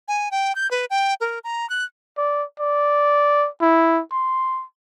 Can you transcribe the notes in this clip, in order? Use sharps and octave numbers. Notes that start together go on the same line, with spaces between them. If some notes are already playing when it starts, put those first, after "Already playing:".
G#5
G5
G6
B4
G5
A#4
A#5
F#6
D5
D5
E4
C6